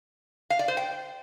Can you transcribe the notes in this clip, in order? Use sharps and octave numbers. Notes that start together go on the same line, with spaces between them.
F5
D5
C5
G5